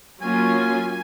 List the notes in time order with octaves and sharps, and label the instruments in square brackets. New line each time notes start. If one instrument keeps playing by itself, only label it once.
[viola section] F#3 A#3 C#4 F4 [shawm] G#5
[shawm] G#5